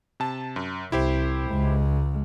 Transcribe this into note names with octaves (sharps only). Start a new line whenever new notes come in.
C3 A5
F#2
C2 E4 G4 C5
C#2 G#3